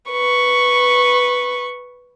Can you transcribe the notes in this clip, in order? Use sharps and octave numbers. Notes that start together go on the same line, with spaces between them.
B4 C#6